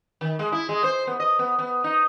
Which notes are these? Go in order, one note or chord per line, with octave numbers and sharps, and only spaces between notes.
D#3
G#3
E4
G#3
C5
B3
D#5
B3
B3
D#4